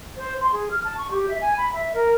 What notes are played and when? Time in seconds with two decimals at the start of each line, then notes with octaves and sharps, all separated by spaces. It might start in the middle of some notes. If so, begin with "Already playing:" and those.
0.17 C5
0.41 C6
0.52 G#4
0.71 F6
0.84 A5
0.98 C#6
1.11 G4
1.28 E5
1.41 G#5
1.58 B5
1.73 E5
1.94 A#4